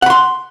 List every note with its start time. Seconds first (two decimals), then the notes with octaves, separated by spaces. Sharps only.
0.02 F#5
0.06 B5
0.10 C6